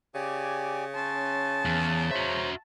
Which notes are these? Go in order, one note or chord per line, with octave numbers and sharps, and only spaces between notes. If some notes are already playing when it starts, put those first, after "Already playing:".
C#3 G4 D5 G#5
C#4 A5 C6
E2
F#4 C5 C#5 E5 A#5